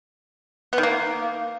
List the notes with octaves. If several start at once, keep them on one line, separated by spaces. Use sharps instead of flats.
B3
D#3
A#3